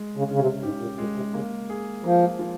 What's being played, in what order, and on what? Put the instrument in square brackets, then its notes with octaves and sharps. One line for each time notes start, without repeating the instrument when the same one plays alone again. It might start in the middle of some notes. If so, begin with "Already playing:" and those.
Already playing: [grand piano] G#3
[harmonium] C#3
[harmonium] C#3 [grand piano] C#4
[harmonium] C3
[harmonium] G#2 [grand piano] G4
[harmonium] A#2
[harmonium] A#2 [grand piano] G#3
[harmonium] C3
[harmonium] C#3 [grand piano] A#3
[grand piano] G#4
[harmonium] F3 [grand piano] A#3
[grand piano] F3